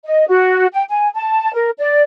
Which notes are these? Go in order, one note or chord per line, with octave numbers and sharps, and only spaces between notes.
D#5
F#4
G5
G#5
A5
A#4
D5